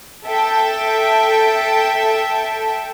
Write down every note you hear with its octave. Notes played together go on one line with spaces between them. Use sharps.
A4 E5 G5